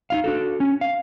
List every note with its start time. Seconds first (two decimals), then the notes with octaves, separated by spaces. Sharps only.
0.10 D#4 E4 F5
0.24 D4 F#4 A4
0.60 C#4
0.81 F5